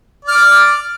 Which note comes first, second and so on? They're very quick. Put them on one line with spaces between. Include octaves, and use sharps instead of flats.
D5 F6 D6